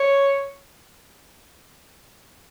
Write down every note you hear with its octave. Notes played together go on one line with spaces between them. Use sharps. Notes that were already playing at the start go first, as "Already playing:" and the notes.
Already playing: C#5